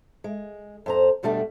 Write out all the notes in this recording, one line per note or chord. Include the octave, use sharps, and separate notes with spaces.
G#3
F2 C5 A#5
F2 B2 G3 A3 D4